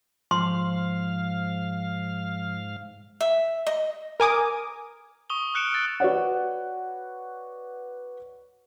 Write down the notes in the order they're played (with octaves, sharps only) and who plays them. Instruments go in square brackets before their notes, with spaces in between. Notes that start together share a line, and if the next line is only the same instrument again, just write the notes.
[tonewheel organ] G#2 F5 [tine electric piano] F3 [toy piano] C6
[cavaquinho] E5
D#5
[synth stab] A#4 G#5 D6 D#6
[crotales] C#6 D#6 F7 G7
F6 F#6 C#7 D7 E7
E6 A6
[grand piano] F#4 B4 C#5 D5 F#5